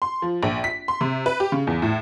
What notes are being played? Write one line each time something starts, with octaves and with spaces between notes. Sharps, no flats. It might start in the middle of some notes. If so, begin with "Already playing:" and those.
C6
F3
A#1
B6
C6
C3
B4
G4
C#3
E2
A2